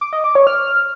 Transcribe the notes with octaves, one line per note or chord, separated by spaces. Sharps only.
D6
D#5
D6
C#5
F6